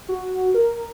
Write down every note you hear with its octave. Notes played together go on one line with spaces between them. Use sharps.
F#4
A#4